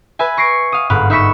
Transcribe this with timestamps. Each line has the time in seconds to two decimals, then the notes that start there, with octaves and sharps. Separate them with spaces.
0.19 B4 E5 G#5
0.37 C#6 A#6 C7 D7
0.72 F5 D#6
0.90 G1 G#2 F5 B5 F#6
1.10 D#4 E5 B5 C#6 B6 E7